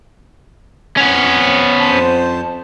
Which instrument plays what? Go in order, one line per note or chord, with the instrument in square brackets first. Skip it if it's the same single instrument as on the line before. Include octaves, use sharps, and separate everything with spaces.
[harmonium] F2 [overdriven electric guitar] B3 C#4
[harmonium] F2 C5 A5